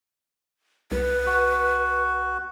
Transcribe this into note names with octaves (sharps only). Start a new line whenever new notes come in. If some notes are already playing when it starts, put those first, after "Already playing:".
C2 B4
F#4